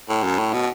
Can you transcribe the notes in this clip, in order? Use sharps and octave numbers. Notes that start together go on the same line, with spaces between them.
A2
F#2
A2
B2